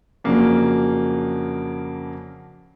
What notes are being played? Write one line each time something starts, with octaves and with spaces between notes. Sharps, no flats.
F2 C#3 F#3 A#3 D4